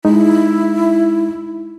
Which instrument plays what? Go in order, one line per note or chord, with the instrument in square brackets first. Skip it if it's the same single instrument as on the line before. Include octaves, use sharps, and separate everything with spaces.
[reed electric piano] G#3 D#4 [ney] E4